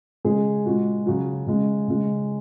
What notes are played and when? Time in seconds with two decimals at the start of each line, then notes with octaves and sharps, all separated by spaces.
0.24 C#3 G#3 G#4
0.66 A#2 G#3 F#4
1.06 C#3 F#3 F#4
1.47 C#3 G#3
1.88 C#3 G#3